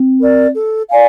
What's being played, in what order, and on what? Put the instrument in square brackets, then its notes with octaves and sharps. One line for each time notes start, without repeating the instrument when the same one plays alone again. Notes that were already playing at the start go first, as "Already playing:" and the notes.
Already playing: [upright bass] C4
[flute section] A#4 D5
A4
D5 F5 G#5